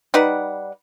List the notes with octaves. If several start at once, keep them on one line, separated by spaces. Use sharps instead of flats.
G3 D#4 B4 F#5